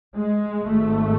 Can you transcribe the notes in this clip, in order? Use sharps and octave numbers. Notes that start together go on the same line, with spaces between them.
G#3
G#1 G#2 A3